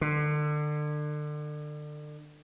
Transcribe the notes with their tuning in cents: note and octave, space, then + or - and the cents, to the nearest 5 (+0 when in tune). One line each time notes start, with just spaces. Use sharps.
D3 +30